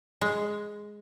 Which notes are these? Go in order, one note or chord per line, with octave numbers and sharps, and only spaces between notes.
G#3